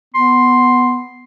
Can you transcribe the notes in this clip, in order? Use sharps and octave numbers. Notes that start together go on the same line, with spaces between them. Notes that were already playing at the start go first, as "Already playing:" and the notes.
B3 C6